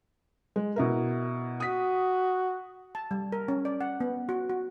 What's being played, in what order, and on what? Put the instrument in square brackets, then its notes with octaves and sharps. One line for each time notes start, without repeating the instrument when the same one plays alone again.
[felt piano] G#3
B2 E4 A#4
[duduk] F#4 [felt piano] D#6 B6
[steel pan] A5
G3
A#4
C#4
D5
F#5
B3
F#4
F#4